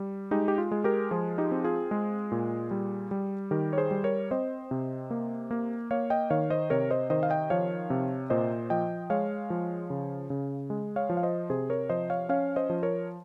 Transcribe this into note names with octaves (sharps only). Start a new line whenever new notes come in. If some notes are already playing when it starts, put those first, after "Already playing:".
Already playing: G3
G#3 D#4 G4
G4
F4
G#3
G4 A#4
F3 F4 G#4
D#4 G4
C4
F4 G#4
G#3
A#2
G3
G3
D#3 G4 A#4
C#5
G#4 C5
G3
A#4 C#5
C4 C5 D#5
C3
A#3
A#3
A#3 C#5 F5
D#5 G5
D#3 C#5 F5
C5 D#5
C3 A#4 C#5
C5 D#5
D#3 C5 D#5
F5
D#5 G5
F3 C#5 F5
C3
A#2 C5 D#5
F3 D#5 G5
G#3 C#5 F5
F3
C#3
C#3
G#3
C#5 F5
F3
F5
C5 D#5
C3 G#4 C5
A#4 C#5
F3 C5 D#5
C#5 F5
C#4 C#5 F5
C5 D#5
F3
A#4 C#5